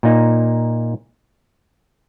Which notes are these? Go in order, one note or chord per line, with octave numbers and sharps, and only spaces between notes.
A#2 A#3 D#4